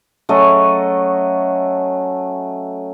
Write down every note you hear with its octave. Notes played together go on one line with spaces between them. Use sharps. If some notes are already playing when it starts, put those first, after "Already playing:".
F#3 A3 C#4 D#5